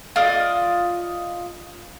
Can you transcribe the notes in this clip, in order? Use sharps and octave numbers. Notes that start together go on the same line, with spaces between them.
F4 D5 D#5